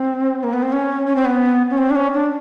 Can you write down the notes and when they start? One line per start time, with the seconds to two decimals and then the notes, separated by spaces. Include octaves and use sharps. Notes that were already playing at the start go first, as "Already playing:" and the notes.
Already playing: C4
0.43 A#3
0.53 B3
0.62 C4
0.72 C#4
1.06 C#4
1.16 C4
1.25 B3
1.70 C#4
1.78 C4
1.90 D4
1.95 C#4
2.14 D4